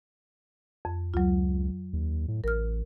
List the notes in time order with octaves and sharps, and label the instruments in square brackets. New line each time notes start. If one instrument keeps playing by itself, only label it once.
[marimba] F2
[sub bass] C#2 [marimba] F#3 F4
[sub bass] D#2
A2
[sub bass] A1 [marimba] A#4 F6